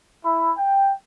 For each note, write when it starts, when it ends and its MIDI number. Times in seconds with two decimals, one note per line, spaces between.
0.25 0.52 64
0.57 0.93 79